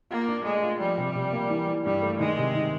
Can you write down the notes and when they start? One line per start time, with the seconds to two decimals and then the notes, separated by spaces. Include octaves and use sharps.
0.11 A#3 F4
0.28 D4
0.45 G#3 A3
0.63 F4
0.80 F3 G3
0.98 C3
1.16 C3
1.33 A#3
1.50 E3
1.68 E3
1.85 G2 G3
2.03 A3
2.19 D#3 G#3
2.37 C3
2.55 D#3